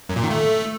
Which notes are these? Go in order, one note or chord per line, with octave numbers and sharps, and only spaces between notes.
F#2
A#2
D#3
A3